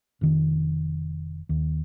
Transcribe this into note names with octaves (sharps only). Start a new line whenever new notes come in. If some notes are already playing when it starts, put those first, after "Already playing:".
F1 D#3
D#2